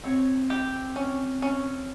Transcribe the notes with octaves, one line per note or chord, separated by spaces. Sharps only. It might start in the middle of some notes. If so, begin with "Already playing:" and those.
C4 C#5
G4
C#4
C#4